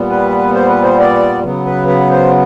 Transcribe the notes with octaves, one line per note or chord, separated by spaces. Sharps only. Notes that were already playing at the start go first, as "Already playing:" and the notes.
Already playing: A#2 G3 B3
B4
C5
B4
C5
D5
C#3 F#3 B3
B4
B4
C5